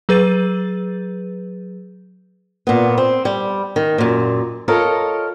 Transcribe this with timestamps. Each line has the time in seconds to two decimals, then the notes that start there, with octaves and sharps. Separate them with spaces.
0.09 F#3 G#4 B4 G6 A6 D#7
2.67 A#2 B3
2.98 C4
3.25 G3
3.76 D#3
3.98 F#2 A#2
4.68 F4 A4 A#4 C#5 D#5